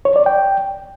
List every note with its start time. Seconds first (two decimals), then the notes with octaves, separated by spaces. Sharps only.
0.05 C#5
0.16 D5
0.26 G5